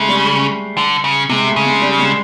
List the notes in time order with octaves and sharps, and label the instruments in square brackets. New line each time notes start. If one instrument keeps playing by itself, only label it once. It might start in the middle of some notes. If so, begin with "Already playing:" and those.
Already playing: [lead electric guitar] C#3 [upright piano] G#3 A3
[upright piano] G3
[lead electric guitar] D3
C#3
[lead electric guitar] C3 [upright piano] G#3
[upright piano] A3
[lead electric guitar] C#3
[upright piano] G#3
G3
G#3